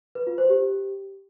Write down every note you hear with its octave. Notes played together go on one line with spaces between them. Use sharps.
B4
F4
C5
G4